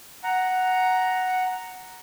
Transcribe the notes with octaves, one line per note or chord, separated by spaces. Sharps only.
F#5 A#5